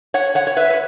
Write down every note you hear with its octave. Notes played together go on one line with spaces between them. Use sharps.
C#5 F#5
C#5 F#5
C#5
B4 E5
B4